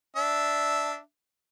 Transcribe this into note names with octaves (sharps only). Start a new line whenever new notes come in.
D4 E5